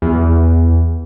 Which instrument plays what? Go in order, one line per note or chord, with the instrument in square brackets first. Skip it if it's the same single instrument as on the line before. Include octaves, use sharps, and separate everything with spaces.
[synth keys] E2